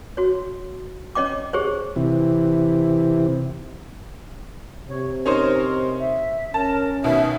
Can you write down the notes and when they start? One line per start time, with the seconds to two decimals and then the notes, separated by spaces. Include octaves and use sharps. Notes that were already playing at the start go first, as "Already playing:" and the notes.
0.17 F#4 C#5
1.15 C#4 C#5 D#5 G5 D6
1.53 G4 G#4 C5 C#5
1.96 C3 E3
4.88 C3 C#5
5.26 C#4 D#4 A#4 C5
5.99 E5
6.54 C#4 A#4 A5
7.04 B2 D#3 B4 E5